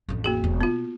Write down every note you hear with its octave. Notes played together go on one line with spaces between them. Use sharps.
A1 F2
A#3 F#4 G#4
E1
B2 B3 F4